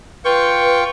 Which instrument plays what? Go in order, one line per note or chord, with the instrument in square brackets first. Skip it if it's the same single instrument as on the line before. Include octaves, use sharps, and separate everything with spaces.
[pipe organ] F4 G5 C#6 [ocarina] B4